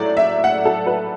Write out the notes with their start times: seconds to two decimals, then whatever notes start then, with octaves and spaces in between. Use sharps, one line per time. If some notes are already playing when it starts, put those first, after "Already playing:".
Already playing: A2 F#3 A3 D5
0.17 E5
0.44 F#5
0.65 A4
0.86 B4